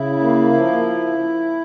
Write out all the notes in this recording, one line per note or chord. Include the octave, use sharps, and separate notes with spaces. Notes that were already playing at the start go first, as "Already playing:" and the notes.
Already playing: C#3 E4
A#3
F3